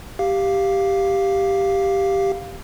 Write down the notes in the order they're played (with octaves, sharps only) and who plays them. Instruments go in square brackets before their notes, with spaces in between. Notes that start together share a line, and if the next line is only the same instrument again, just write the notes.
[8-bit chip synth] G4 F5